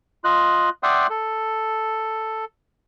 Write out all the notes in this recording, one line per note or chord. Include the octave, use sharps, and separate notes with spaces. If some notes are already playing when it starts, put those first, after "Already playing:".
F4 D#5 F#6
D5 E5 F#5 G5 C6 D#6
A4